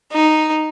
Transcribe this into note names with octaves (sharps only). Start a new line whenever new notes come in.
D#4